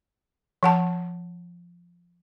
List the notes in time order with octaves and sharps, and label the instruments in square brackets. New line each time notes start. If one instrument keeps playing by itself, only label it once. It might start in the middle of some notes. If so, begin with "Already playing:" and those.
[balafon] F3 F#5 A5